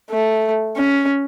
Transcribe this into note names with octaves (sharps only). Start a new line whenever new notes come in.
A3
C#4